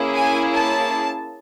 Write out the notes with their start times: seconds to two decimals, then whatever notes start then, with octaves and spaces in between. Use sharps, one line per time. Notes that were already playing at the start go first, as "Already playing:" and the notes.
Already playing: A#3 C#4 E4 G#4
0.15 G#5
0.53 A5